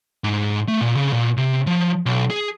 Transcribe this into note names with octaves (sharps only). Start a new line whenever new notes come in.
G#2
A3
A#2
C#3
A#2
C3
F3
B1
G#4